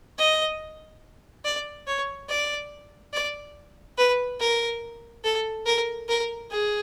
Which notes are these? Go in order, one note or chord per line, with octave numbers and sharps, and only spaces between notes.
D#5
D5
C#5
D5
D5
B4
A#4
A4
A#4
A#4
G#4